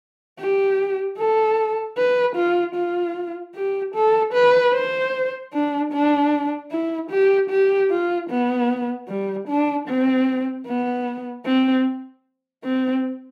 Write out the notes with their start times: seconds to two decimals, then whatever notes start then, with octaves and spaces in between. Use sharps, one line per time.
0.39 G4
1.18 A4
1.98 B4
2.36 F4
2.76 F4
3.55 G4
3.95 A4
4.34 B4
4.74 C5
5.53 D4
5.93 D4
6.72 E4
7.11 G4
7.50 G4
7.90 F4
8.30 B3
9.09 G3
9.48 D4
9.88 C4
10.67 B3
11.46 C4
12.65 C4